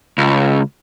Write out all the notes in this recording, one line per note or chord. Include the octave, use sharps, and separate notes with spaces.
C#2